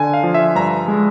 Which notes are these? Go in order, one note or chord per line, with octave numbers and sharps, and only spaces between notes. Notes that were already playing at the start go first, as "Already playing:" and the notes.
Already playing: D3 G#5
F5
F3
E5
G2 A#5
G#3